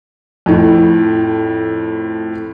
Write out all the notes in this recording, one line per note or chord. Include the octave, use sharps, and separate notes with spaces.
F2 A2